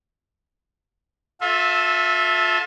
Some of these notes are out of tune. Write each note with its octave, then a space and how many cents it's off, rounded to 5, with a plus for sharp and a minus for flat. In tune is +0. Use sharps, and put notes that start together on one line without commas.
F4 +30 A4 -15 E5 +0